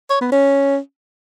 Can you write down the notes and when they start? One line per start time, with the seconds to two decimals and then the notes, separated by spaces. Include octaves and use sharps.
0.10 C#5
0.21 B3
0.32 C#4